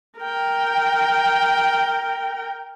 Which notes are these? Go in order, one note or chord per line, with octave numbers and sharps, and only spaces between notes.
A#4 G5